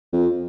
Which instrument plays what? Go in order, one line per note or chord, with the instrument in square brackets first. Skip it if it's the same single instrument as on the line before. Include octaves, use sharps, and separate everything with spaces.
[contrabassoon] F2